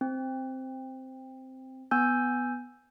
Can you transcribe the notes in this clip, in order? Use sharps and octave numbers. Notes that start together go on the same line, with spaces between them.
C4
B3 G#5 E6 G6